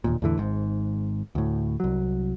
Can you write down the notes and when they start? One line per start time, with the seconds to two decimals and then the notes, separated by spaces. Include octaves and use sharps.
0.04 E1 D#2 A#2
0.22 E2 A2 D3 E3
0.38 G#1 G#2
1.35 D2 A2
1.80 C2 F#3